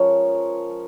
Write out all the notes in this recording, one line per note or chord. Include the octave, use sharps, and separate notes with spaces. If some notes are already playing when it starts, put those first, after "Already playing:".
Already playing: F3 G#3 C#4 A#4 C#5